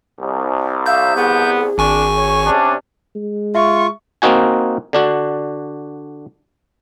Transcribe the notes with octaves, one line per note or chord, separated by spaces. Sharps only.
C2
E5 F5 G6
B3 G#4
G#1 D4 G#5 C#6
C#5
C3 C#4 D4
G#3
F4 E5 C#6
A#3 C4 D#4 F#4 G#5
D3 D4 F#4